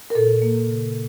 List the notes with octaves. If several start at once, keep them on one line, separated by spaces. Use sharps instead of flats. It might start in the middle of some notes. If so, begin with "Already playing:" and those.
A#4
A#2 A4
A#3
C#3